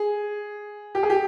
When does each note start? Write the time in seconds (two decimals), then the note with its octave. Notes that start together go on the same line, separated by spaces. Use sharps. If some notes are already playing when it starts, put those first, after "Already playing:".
Already playing: G#4
0.95 G4
1.03 G#4
1.10 G4